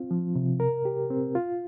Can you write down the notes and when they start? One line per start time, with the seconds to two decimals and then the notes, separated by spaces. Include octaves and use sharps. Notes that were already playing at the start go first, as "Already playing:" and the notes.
Already playing: C4 F4
0.11 F3
0.36 C3
0.60 A#4
0.85 G4
1.10 C4
1.35 F4